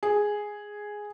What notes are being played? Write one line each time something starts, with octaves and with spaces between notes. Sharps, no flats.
G#4